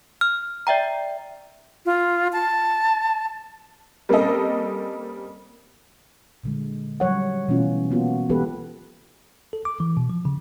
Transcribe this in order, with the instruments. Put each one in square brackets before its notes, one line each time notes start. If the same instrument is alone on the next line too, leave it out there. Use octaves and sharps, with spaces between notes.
[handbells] F6
D5 E5 G5 A#5
[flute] F4
A5
[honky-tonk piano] G3 A#3 C4 C#4 A4 D#5
[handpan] A#2 D3 G#3
F#3 G3 C#5 F#5
B2 E3 A3 C#4 F4
A#3 B3 F4 F#4
E3 G#3 B3 G4 A4 B4
[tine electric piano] A4
D6
E3
B2
F3
C#3